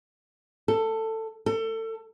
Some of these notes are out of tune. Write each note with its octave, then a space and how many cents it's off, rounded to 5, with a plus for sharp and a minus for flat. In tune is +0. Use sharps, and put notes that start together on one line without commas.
A4 +15
A4 +30